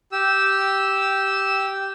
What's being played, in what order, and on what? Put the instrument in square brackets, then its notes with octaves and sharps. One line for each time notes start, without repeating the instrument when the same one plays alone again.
[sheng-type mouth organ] G4 E6